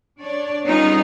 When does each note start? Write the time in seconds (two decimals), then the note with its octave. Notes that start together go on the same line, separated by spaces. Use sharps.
0.20 D4 C#5 D5
0.65 G3 B3 C#4 D#4 F4 G#4